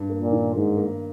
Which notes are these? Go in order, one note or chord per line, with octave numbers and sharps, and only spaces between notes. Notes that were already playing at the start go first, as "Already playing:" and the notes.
Already playing: G2
A#3
A#2
D#3
G#2 A#3
A#3